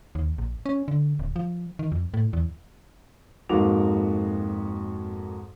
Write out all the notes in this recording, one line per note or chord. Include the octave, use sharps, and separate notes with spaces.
D#2
A#1
C#4
D3
D1
F3
D#3
F2
A2
E2
F2 G#2 A#3 F#4 D6 F7